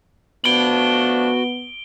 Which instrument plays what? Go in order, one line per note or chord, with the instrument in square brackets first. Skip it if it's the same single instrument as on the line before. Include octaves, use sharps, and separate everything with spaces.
[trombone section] F3 A3 D4 [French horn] B3 [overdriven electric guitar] F#4 B5 [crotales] D7 G7